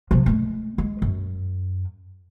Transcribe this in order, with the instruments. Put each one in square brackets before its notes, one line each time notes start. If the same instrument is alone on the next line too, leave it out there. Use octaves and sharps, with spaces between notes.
[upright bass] C3 F3
G#3 A3
G#3
F#2